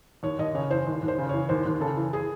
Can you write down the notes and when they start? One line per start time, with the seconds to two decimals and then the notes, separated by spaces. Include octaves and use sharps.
0.23 D#2 C#5
0.39 D#2 D#5
0.54 C#3 C#5
0.70 E3 C5
0.87 D#2
1.03 D#2
1.08 C5
1.19 C#3
1.29 E3 C#5
1.49 D#2 C5
1.66 D#2
1.81 C#3 A4
1.97 E3
2.13 G#4